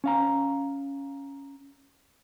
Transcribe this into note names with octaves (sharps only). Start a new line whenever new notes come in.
C#4 F5 A#5